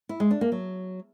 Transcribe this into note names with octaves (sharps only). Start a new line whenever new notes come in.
E4
G#3
D4
A#3
F#3